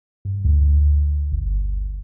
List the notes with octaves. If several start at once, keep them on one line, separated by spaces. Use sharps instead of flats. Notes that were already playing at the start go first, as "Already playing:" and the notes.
G2
D2
G1